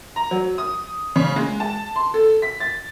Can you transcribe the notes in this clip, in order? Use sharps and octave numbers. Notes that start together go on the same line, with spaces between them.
A#5
F#3
D#6
C#3
G#3
A5
C6
A4
B6
A6